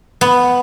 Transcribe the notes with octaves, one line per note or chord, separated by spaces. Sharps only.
B3